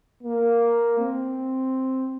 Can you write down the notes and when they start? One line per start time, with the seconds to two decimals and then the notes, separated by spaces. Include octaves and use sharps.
0.23 A#3
0.99 C4